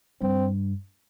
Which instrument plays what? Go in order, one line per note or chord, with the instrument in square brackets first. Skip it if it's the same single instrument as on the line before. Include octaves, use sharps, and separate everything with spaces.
[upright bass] G2 [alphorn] C4